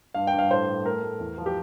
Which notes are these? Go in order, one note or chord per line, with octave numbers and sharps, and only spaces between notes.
G2 F5
G5
G2
F5
A2 C5
A2
A3 A#4
A3
E2
F3
G4